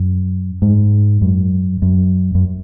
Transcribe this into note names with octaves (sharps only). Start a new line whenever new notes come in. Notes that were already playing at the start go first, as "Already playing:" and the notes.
Already playing: F#2
G#2
F#2
F#2
F#2